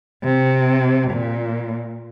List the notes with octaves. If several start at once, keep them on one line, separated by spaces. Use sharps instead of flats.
C3
A#2